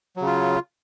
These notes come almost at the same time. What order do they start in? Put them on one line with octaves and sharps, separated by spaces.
F#3 C#3 F4